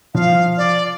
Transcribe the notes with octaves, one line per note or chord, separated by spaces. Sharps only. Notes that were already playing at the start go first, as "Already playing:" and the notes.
F3 F5
D5